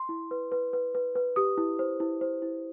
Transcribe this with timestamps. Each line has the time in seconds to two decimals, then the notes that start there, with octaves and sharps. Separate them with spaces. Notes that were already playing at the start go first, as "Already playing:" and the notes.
Already playing: C6
0.09 E4
0.31 B4
0.52 B4
0.73 B4
0.95 B4
1.15 B4
1.36 G4 D#6
1.58 E4
1.79 C5
2.00 E4
2.21 C5
2.42 E4